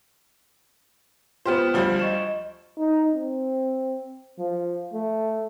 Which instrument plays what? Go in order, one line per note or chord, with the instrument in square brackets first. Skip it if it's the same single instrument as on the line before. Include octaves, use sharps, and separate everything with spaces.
[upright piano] B3 G4 C5 [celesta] F4 F6 E7
[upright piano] D2 F3 G3
[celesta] D#5 C#6 E7
[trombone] D#4
C4
F3
A3